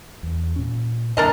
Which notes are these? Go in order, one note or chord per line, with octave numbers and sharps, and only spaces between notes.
E2
A#2 C#4
F#2 A#2 D3 D4 A#4 D#5